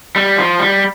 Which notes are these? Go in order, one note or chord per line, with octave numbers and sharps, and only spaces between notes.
G3
F3
G3